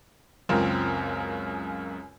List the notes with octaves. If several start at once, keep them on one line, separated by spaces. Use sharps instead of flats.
C#2 F#2 C#3 C4 F4 A#4